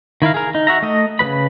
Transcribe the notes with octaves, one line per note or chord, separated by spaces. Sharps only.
D#3 E4 A#4 F5
G#4 A#4
D#4
F#4 E5 A#5
A3 D#5
C#3 G3 B4 B5